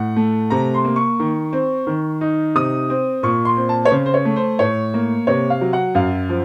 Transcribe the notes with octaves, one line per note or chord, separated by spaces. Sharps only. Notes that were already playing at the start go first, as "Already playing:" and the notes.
Already playing: A2 F#5
A3
C3 A#5
C6
A#3
C#6
D#3
C4
D#3
D#4
C3 D#6
C4
A#2 C#6
C6
C4
A5
C#5
C#3 C5
C5
C#5
A3
C5
A2 C#5
A#3
C3 C#5
F5
F#3
F#5
F#2 F5
F3